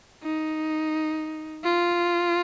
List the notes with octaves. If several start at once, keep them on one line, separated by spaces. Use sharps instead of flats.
D#4
F4